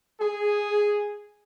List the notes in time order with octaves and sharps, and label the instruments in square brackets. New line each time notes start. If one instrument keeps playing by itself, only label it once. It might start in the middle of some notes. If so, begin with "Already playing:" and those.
[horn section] G#4